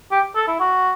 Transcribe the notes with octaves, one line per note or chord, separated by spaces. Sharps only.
G4
A4
E4
F#4